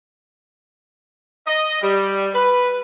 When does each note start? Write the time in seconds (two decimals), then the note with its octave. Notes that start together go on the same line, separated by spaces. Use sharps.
1.46 D#5
1.82 G3
2.34 B4